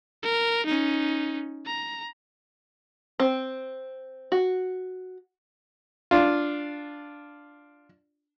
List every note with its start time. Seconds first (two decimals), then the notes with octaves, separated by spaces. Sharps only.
0.23 A#4
0.66 C#4 D#4
1.66 A#5
3.20 C4
4.32 F#4
6.11 D4 F4